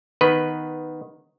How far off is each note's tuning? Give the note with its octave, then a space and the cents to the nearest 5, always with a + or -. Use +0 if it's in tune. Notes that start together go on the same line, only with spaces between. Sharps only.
D#3 +0 B3 +10 B4 +0